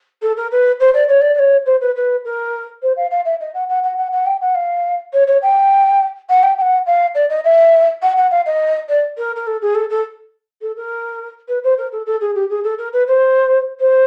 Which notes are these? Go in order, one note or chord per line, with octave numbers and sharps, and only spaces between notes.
A4
A#4
B4
C5
D5
C#5
D5
D5
C#5
C5
B4
B4
A#4
C5
F5
F5
E5
D#5
F#5
F#5
F#5
F#5
F#5
G5
F#5
F5
C#5
C#5
G5
F#5
G5
G5
F#5
F5
D5
D#5
E5
F#5
F#5
F5
D#5
D5
A#4
A#4
A4
G#4
A4
A4
A4
A#4
B4
C5
A#4
A4
A4
G#4
G4
G#4
A4
A#4
B4
C5
C5